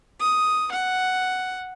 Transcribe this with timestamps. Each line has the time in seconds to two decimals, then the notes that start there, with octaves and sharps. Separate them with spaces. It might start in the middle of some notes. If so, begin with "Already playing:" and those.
0.20 D#6
0.71 F#5